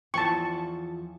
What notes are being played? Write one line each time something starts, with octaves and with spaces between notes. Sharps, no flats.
E2 F3 G5 A5 C#6